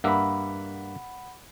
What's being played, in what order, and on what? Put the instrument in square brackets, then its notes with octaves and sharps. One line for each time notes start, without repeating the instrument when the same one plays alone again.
[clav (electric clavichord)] G2 A#3 E5 [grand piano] F#5 B5